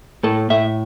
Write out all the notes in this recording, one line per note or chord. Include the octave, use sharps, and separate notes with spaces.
A2 A4
A2 E5